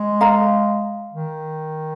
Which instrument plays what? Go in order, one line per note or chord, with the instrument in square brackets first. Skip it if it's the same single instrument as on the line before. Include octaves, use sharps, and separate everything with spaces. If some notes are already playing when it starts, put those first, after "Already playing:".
Already playing: [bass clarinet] G#3
[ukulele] F5 A#5
[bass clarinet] D#3